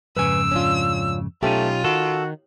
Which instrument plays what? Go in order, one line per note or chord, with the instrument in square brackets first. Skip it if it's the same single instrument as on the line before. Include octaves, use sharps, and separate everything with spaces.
[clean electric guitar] F2 G#2 C#3 [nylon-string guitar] B4 G#5 [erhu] E6
[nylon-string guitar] C#4 D4 F4
[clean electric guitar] B1 D#4 [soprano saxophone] A3 [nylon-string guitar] C#4 G4 [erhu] F4
[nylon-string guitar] D#3 [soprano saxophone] F#4 [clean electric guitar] A4